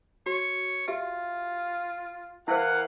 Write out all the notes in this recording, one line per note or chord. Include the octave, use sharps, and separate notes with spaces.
F#4 C#5
F4 G4 E5
E3 E4 A#4 C5 F5 F#5